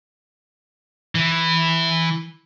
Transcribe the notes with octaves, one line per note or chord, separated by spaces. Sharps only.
E3